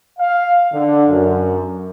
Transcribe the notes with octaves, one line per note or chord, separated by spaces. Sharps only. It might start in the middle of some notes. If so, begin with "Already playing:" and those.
F5
D3
F#2